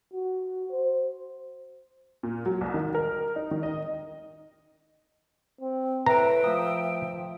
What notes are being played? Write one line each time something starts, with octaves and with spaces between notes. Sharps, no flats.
F#4
C5
A#2
F#3
C2
D#3
A#4
D#4
D#3
D#5
C4
A2 B4 E5 G5 A#5
F3 A3 D#6